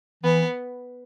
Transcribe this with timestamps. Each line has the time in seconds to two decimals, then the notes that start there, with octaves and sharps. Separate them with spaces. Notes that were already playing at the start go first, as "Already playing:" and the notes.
0.24 E3 B3